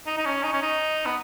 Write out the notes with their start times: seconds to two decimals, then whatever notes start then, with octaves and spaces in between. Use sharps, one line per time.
0.07 D#4
0.17 D#4
0.25 C#4
0.43 D#4
0.53 C#4
0.62 D#4
1.05 B3